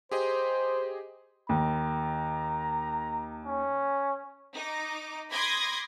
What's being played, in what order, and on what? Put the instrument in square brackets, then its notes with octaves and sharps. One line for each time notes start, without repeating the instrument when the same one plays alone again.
[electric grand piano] G4 G#4 D#5 [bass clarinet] C5
[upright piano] D#2 [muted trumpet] A#5
[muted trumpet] C#4
[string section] D#4 D6
B5 C6 D6 D#6 G#6 A#6